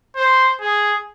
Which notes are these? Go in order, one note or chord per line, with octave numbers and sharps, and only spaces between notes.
C5
G#4